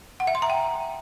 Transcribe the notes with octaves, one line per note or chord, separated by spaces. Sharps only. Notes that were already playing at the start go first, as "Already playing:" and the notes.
F#5
E5
C6
A#5
G5